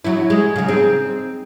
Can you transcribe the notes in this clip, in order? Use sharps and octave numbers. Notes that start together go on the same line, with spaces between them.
F#3 E4
G#3
C#3 F#3
C4 D#4 G#4